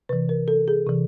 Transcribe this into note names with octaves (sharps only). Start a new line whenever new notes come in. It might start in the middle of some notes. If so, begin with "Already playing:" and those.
C3 E3 B4
A#4
A4
G#4
C3 E3